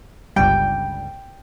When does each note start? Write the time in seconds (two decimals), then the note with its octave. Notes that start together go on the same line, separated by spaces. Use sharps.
0.36 G1 C#2 G3 G5